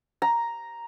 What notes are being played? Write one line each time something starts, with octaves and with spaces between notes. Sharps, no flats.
A#5